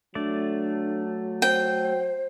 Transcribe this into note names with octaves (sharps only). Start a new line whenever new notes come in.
F#3 A3 D4 D5
C5 G5